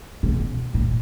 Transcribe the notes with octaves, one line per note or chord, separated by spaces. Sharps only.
B2
A#2